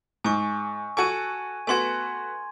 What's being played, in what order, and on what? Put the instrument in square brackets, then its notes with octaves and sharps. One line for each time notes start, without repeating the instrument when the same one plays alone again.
[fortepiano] G#2 [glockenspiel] G#5 C#6
[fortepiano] F#4 A4 C#6 [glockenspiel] G#5 G#6 D#7
[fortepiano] A3 B3 F#4 [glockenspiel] G#5 C6 G#6